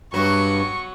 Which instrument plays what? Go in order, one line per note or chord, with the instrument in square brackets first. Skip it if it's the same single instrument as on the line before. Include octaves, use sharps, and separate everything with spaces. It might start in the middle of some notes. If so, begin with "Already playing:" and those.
[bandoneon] G2 [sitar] F#3 B3 F#4 [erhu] C#6